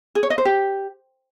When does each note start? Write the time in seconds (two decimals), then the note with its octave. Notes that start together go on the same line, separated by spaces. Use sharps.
0.15 G#4
0.23 C#5
0.30 D#5
0.38 C5
0.45 G4